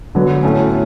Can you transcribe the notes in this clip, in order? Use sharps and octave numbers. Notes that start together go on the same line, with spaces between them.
D3 F#3 B3
A2 F#3 A3 C#4